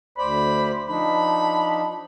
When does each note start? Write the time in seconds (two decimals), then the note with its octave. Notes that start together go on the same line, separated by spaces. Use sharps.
0.18 D2 C5 D5 B5
0.88 F3 D4 D#4 B5